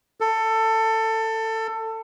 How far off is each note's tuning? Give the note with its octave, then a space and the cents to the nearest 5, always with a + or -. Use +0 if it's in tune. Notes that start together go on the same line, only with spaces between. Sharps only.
A4 +20